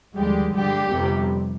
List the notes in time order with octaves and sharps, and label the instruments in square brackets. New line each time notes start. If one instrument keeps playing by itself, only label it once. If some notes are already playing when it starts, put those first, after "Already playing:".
[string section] D#2 D3 F3 G3 G#3 G4
G2 D3 G3 G#3 G4
G1 F2 C3 G3